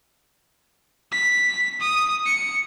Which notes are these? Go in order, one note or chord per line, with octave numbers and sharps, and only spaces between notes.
B6
D#6
C#7